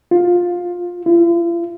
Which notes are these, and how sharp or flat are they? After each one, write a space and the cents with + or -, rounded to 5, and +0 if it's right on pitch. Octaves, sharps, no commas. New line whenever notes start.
F4 +15
F4 -45